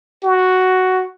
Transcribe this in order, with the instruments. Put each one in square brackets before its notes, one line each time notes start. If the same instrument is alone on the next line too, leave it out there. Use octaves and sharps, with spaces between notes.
[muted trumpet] F#4